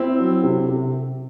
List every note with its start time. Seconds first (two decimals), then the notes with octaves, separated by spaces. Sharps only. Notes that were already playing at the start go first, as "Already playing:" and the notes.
Already playing: C4 E4
0.19 F#3
0.43 C3
0.69 C3